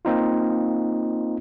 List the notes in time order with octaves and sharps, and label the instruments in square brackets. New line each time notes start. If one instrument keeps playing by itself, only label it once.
[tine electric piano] A#3 C4 D#4 F4